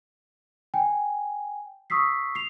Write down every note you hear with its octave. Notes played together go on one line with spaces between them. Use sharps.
G5 G#5
C#6 D#6 E6 B6 C7
C7 F7